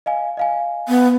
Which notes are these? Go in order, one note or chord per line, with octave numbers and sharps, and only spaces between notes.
D#5 F5 G#5
D#5 F5 G#5
B3